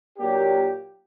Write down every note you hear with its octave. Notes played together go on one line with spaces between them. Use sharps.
A#2 F#3 A#3 D4 G4